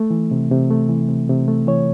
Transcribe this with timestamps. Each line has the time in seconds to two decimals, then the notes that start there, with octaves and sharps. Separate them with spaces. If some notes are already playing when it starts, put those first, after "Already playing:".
Already playing: A3
0.11 E3
0.31 C3
0.51 C3
0.70 A3
0.89 E3
1.09 C3
1.29 C3
1.48 A3
1.67 E3 C#5